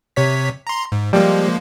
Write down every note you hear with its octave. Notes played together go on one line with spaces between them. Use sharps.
C3 C#5 B6
A#5 C6
G#2
F3 G3 G#3 A#3